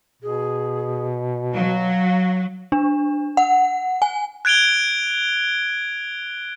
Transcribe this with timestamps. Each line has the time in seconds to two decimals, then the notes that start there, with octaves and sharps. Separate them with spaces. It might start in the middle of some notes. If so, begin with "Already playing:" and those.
0.22 B2 G#4
1.54 F#3 F5
2.72 D4
3.37 F#5
4.02 G#5
4.45 F#6 G#6 D7 F7 G7